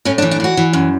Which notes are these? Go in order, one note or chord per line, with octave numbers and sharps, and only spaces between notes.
A2 C#4
D4
E3
D4
E3 F#4
E3
F#2